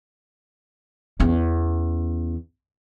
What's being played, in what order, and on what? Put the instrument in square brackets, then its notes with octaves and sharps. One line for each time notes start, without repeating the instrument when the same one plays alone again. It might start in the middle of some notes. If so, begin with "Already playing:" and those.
[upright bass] E2 C#4